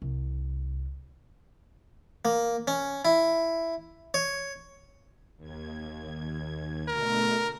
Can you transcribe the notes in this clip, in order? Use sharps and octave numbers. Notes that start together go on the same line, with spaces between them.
C2
A#3
C#4
E4
C#5
D#2 G#6
B2 D3 A3 A#4